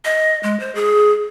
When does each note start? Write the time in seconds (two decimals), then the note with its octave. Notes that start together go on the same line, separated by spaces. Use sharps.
0.05 D#5
0.43 G#3
0.60 C5
0.75 G#4